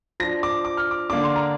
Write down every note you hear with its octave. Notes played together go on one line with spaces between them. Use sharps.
F3 D4 A#6
D6
D6
F6
D6
D3 A#3 D4 D6
C6
A#5